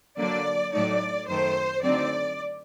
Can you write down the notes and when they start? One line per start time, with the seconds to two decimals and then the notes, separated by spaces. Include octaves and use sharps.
0.18 D3 F#3 A#3 D4 D5
0.72 A2 F#3 A3 D#4 D5
1.27 F#2 D#3 A3 C5
1.82 D3 F#3 A3 C4 D#4 D5